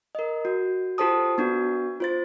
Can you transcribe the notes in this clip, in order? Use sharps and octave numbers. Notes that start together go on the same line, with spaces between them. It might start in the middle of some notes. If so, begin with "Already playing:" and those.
A#4 D#5
F#4
F4 G4 A4 C5 A5 D#6
B3 D4 F#4
F4 C5 A6